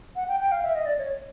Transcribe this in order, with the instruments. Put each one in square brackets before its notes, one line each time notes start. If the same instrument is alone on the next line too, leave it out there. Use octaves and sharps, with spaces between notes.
[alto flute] F#5
G5
G5
F5
E5
D#5
D5
C#5